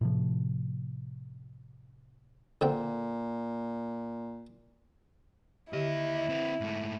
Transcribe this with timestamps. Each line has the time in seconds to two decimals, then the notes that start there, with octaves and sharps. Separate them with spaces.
0.01 A2 C3 F3
2.61 A#2 D3 C4 G5
5.73 D#2 D3 E4 G4 D#5
6.29 C4 B4
6.61 G#2 A3